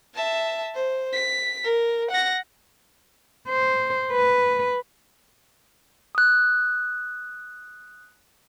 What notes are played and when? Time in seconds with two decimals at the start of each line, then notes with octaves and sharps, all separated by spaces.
0.14 E5 A5
0.75 C5
1.12 B6
1.64 A#4
2.11 F#5 A#6
3.49 C5
4.12 B4
6.15 D#6 F#6